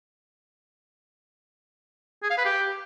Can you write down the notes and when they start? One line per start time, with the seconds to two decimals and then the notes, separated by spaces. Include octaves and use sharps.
2.23 G#4
2.30 F5
2.38 B4
2.45 G4